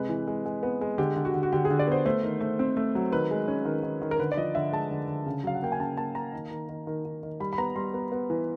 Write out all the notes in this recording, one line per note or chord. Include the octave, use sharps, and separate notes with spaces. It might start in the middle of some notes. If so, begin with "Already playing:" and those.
Already playing: C3 G#3 B4
E3
G#3
G#3
B3
G#3
D3 G4
D3
F#4
D3
F#4
D3 G4
G#4
D3
D5
B3 C5
A3 C5
D#3
A3
C4
A3
F#3
D#3 B4
G#3
C#4
D#3
D#3
D#3
A#4
D3 B4
D5
F3 D#5
D3 E5
G#3 A5
D3
D3
C#3
F#3 F5
F#5
A#3 G5
G#5
C#3 A5
A#3 A5
A#3 A#5
D#3
D#3
D#3
D#3
D#3
D#3
G3 B5
B5
B3 A#5
G3 C6
B3
B3
E3